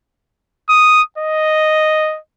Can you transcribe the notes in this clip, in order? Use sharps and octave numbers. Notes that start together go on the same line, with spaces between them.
D#6
D#5